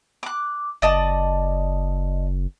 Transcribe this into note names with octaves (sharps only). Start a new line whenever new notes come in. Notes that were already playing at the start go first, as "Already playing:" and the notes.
D6 F#6
F#1 D5 D#5 A5